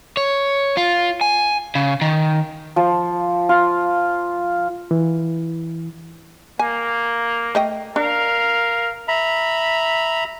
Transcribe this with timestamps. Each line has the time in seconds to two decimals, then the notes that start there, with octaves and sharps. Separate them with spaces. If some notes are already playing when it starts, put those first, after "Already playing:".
0.17 C#5
0.77 F4
1.21 G#5
1.75 C#3
2.01 D#3
2.76 F3
3.49 F4
4.91 E3
6.59 A#3 G#5
7.55 A3 D#5 G5
7.96 D4 A#4 F5
9.08 E5 A#5 B5